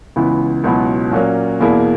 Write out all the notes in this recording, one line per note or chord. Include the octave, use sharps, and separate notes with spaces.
C#2 C#3 E3 B3 E4
C#2 B2 F#3 B3 E4
A#2 F#3 A#3 C#4
E2 B2 A#3 E4 G#4